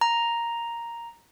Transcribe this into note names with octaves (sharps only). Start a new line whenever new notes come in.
A#5